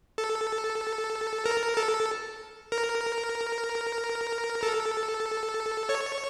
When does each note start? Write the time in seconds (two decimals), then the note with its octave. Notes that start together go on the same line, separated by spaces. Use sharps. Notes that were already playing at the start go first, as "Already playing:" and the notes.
0.18 A4
1.46 A#4
1.77 A4
2.72 A#4
4.63 A4
5.89 C#5